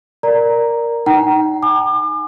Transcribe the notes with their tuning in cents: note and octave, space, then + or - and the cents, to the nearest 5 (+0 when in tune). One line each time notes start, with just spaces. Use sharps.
A#4 +0 D5 +0 A#5 +0
D#4 +0 G5 -45 A#5 +20
G#5 +5 D6 +40